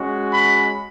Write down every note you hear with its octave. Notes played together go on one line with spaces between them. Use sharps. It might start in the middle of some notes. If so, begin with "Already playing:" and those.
Already playing: G#3 C#4 F#4
B5